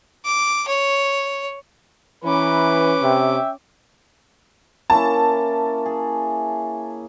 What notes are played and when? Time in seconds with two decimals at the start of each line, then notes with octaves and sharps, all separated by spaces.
0.25 D6
0.68 C#5
2.24 E3 C#4 E4 B4 A#5 B5 D6
3.02 C3 E5 G5
4.90 A#3 C#4 E4 A5
5.86 G#4